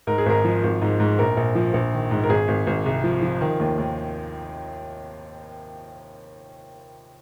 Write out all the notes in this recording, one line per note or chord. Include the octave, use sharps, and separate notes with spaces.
G#2 A#4
G#4
G#1 A#4
F3
G#1
G#2
G#2
A#1 A#4
A#1
F3
A#1
D#3
G#2
A#4
G#1 G#4
G#1
G#1
C2
F3
F3
D#3
D#2
D#2